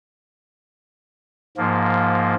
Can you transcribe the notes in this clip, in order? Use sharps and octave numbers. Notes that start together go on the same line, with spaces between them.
G#2 F3 A#3